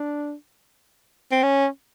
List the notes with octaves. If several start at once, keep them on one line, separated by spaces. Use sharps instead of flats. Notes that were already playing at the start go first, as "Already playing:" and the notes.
Already playing: D4
C4
C#4